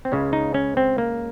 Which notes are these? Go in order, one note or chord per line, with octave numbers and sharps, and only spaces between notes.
C4
C#2 C#3 G#3 C#4
D#4
C#4
C4
A#3